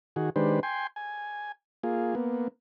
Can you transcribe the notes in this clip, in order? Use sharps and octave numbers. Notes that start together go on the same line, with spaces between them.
D#3 F#4 G#4
D#3 G#3 D4 G4 B4 C5
G5 G#5 C6
G#5
A#3 F4 G#4
A#3 B3